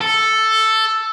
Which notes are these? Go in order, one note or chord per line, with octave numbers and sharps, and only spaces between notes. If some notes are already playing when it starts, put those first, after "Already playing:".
A4